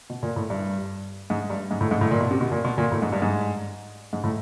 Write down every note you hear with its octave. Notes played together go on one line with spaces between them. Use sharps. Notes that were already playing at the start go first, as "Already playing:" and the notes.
B2
A#2
A2
G2
G#2
G2
G#2
A2
G#2
A2
A#2
B2
C3
B2
A#2
B2
A#2
A2
G#2
G2
G#2
G#2
A2